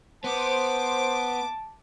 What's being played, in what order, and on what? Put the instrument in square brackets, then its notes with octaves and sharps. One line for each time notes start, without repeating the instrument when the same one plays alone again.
[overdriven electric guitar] B3 [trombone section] C5 [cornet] A5 [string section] D6